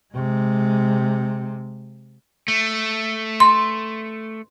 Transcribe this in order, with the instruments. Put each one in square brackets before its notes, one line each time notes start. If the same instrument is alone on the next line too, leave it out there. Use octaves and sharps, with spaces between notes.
[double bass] C3 G#3
[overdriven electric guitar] A3
[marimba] C6